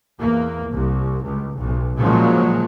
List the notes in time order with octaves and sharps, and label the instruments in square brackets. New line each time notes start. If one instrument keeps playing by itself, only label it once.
[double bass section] E2 A#3
C2
C#2
B1
A#2 C#3 F3 F#3 G#3